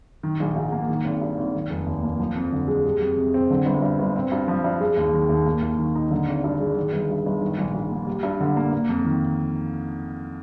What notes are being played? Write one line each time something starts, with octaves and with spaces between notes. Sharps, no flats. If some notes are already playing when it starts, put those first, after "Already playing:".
D#3
A#1
G#2
A#3
D#3
G#1
G2
G#1
D#3
F1
D#2
A#3
F3
F2
D3
G#3
G3
F2
C3
C4
D3
G1
G2
G1
C4
G2
F3
G2
G#3
D#2
D#3
D#2
A#3
D#2
D#3
D#4
D3
G#1
G2
G#3
D#3
G1
G2
G1
D#3
A#1
G#2
A#3
G3
G2
D3
A#3
A#3
F2
D#3